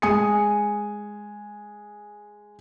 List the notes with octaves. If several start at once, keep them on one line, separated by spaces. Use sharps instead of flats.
G#3 G#5 D#6 C#7